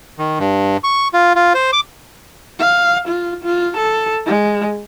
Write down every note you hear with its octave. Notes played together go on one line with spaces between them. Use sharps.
D#3
G2
C#6
F4
F4
C5
D6
F5
F4
F4
A4
G#3